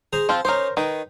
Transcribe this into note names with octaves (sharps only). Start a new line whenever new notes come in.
G#4 C5 A#5
F3 C4 F4 C5
C#4 D#4 A#4 C5 C6
D#3 D#4 B4